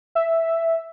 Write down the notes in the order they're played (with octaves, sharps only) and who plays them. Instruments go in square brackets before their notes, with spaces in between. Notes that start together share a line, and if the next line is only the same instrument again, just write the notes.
[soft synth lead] E5